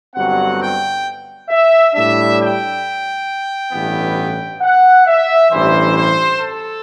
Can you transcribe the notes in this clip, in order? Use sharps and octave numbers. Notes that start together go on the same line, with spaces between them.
G1 G2 F#3 C4 F#5
G5
E5
A2 G3 D4 E5
G5
A1 G2 E3 B3
F#5
E5
A1 G2 E3 C5
C5
A4